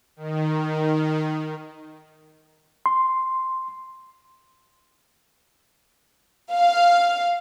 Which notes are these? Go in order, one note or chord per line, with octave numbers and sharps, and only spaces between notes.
D#3
C6
F5